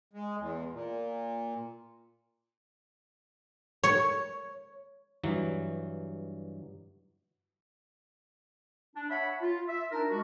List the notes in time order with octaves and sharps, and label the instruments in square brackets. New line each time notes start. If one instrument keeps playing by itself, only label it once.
[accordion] G#3
E2
A#2
[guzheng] C#5
[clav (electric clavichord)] G2 E3 F#3
[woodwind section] D4
C#5 E5 F#5 B5
F4
E5
D4 D#4 A#4
G#3 F#4